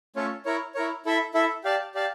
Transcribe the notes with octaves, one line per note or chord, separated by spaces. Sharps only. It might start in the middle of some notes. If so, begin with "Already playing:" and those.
A3 C#4 F4 A4 C#5
E4 A#4 C#5
E4 A#4 C#5
E4 A4 E5
E4 A4 E5
G4 D5 F5 A5
G4 D5 F5 A5